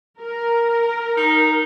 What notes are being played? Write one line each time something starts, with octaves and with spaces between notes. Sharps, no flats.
A#4
D#4